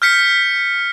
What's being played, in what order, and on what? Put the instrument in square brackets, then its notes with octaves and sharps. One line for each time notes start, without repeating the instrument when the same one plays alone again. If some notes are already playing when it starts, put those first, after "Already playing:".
[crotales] F6 G6 B6 C#7